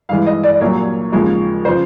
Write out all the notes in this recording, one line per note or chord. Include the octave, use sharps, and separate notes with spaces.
G2 E3 G#3 F5
D#5
D5
D5
C2 A#2 F#3 C#5
D#2 C#3 F3 G#3
C#3 F3 C5